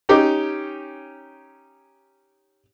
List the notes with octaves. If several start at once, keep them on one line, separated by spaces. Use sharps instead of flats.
C#4 D#4 G4